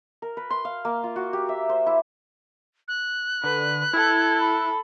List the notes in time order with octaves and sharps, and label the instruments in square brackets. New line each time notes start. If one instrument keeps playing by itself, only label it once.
[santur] A#4
B4
C6
F5
A#3
F4
F#4
G4
E5
C5
E4
[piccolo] F#6
[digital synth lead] D3 [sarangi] B4
[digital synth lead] E4 [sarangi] A4 [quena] G#6
[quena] B5